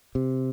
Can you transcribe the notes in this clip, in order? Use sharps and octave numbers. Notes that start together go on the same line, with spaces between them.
C3